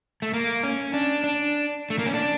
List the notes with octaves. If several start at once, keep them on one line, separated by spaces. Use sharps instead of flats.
A3
A#3
C#4
D4
D4
A3
A#3
C#4
D4